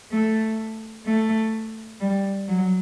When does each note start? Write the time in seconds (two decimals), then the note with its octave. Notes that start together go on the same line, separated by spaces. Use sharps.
0.12 A3
1.06 A3
2.01 G3
2.48 F#3